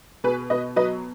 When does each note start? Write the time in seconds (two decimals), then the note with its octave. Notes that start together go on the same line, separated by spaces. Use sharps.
0.24 B2 G#4 B4
0.50 B2 B4 D#5
0.76 F#3 B4 D#5